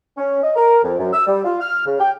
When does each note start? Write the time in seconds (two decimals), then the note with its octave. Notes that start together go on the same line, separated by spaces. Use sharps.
0.17 C#4
0.43 D#5
0.56 A#4
0.83 F2
0.98 F#2
1.13 E6
1.27 G3
1.45 F4
1.61 F6
1.86 C#3
2.00 G5